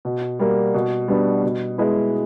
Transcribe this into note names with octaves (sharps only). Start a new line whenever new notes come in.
B2
G3 A#3
B2
G3 B3 D4
B2
G#3 B3 E4